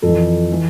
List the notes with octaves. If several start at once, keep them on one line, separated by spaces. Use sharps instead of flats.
F2 E3 A4
E3